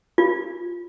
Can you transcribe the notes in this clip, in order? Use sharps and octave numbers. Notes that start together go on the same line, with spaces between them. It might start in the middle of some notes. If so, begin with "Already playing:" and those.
F4